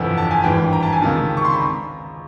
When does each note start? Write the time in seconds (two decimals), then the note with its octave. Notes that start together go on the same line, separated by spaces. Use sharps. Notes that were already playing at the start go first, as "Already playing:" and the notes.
Already playing: G1 F2 C3 E3 F#5
0.17 A5
0.31 G#5
0.44 G#1 G2 E3 G5
0.73 A#5
0.83 A5
0.93 G#5
1.01 C#2 C3 D#3 A5
1.37 C#6
1.45 C6
1.53 B5
1.59 A#5